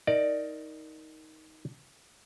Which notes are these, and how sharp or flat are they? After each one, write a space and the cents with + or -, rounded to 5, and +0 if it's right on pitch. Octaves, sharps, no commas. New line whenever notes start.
D#4 +15 A#4 +0 D5 +10